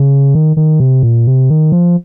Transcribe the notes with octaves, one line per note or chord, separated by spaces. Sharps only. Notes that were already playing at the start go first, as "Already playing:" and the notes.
Already playing: C#3
D#3
D#3
C3
A#2
C3
D#3
F3